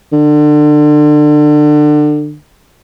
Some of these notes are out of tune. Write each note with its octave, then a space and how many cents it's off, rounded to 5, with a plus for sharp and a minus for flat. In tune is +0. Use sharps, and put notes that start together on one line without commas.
D3 +30